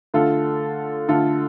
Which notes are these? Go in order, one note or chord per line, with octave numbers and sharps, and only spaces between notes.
D3 A3 F4 A4
D3 A3 F4 A4